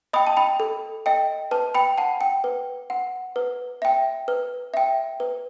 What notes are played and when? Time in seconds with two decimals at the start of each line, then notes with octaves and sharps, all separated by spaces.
0.13 D#5 G5 B5 D#6
0.27 A5
0.37 G5 B5
0.60 A4
1.06 D#5 G5
1.51 B4 A5
1.74 G5 B5
1.98 F#5 A5
2.21 G5
2.44 B4
2.90 F#5
3.36 B4
3.82 E5 G5
4.28 B4
4.74 E5 G5
5.20 B4